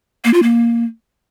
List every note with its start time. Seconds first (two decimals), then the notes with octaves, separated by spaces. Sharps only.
0.25 A#3
0.34 F4
0.43 A#3